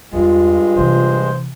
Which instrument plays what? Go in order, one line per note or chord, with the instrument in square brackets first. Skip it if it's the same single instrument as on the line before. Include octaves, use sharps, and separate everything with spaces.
[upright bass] E2 G3 [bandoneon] G2 G#3 [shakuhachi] F4
[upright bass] C3 E3 [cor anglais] C5